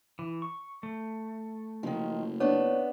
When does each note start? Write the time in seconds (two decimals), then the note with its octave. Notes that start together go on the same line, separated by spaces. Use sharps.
0.19 E3
0.42 C#6
0.83 A3
1.83 F#1 D#3 F3
2.40 B3 D4 C#5